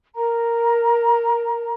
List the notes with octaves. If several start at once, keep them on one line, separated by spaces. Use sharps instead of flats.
A#4 A#5